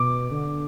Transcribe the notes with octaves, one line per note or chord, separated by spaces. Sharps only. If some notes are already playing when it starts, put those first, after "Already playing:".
Already playing: B2 D6
D3